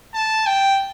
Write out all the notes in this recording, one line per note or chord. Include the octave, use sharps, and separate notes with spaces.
A5
G5